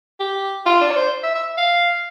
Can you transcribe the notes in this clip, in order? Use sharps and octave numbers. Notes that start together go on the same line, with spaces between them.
G4
F4
D4
D5
C5
E5
E5
F5